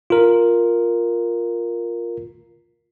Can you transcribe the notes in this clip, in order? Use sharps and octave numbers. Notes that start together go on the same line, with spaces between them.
F4 A#4